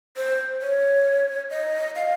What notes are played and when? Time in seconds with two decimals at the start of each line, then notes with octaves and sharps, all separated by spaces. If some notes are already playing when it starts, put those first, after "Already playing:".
0.17 C5
0.62 C#5
1.50 D#5
1.96 F5